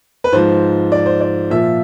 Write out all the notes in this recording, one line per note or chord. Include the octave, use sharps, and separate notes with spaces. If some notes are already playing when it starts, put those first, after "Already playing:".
B4
G#2 F3 C5
D5
C5
D5
A#2 F3 E5